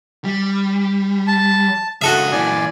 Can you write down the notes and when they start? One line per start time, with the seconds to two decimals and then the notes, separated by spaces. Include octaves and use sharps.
0.24 G3
1.27 A5
2.02 C#2 D4 F#4 A4 E5 D#6
2.32 A#2 E3 D5 G#5